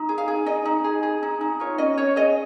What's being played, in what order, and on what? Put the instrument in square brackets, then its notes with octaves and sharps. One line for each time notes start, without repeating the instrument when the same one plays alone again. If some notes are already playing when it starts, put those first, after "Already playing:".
Already playing: [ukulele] D#4
G#4
F5
G#4
D#4 D#5
D#4
G#4
G#4
D#4
D#4
F4 C#5
C#4 D#5
C#4 C#5
G#4 D#5